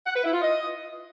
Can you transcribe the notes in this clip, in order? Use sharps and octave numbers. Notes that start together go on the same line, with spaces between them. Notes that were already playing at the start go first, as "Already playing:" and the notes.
F#5
B4
E4
F4
D#5